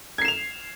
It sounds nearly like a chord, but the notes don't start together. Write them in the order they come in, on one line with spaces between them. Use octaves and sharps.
G#6 C7 E7 F7